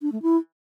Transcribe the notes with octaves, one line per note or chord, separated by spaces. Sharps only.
D4
A3
E4